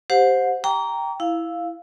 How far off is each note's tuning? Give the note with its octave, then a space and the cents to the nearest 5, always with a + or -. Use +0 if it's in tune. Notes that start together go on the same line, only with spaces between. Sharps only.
G4 +0 C5 +0 F#5 -35
G5 +0 A#5 +0 D6 -45
E4 +0 F5 +0